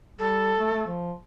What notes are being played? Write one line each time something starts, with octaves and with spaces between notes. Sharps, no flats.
G3 A4
A3
A3
F3